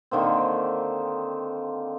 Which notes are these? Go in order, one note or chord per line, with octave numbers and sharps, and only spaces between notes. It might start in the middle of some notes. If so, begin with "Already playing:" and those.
D3 D#3 A#3 C4